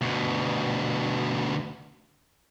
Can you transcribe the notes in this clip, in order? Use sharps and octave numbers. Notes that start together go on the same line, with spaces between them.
D2 B2